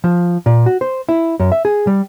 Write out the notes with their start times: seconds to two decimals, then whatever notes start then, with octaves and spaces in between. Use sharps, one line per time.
0.04 F3
0.46 A#2
0.66 F#4
0.81 C5
1.09 E4
1.40 F#2
1.52 E5
1.65 G#4
1.87 G3